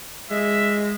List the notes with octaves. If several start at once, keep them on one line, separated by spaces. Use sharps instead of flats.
G#3 E5